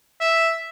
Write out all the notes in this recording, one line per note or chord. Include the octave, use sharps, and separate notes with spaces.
E5